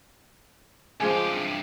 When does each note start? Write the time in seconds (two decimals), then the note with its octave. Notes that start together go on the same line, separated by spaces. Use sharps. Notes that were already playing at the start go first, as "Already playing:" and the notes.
1.00 C#2 F3 G#3 G4 G#5
1.30 G2 C3